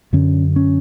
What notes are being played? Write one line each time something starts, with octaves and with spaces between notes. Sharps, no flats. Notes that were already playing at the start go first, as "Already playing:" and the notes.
F#2 D3 C#4
C#4